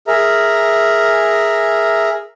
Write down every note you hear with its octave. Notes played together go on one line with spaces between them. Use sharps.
G#4 A#4 E5 A#5